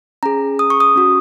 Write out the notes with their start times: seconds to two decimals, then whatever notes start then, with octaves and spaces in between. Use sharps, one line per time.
0.23 C#4 G#4 A#5
0.59 D#6
0.70 C#6
0.80 D#6
0.96 C#4 F#4